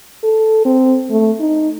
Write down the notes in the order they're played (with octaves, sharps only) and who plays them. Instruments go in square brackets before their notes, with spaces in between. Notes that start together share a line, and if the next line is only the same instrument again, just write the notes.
[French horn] A4
C4
A3
D#4